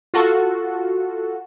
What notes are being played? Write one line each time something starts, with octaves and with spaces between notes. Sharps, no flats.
F4 F#4 A4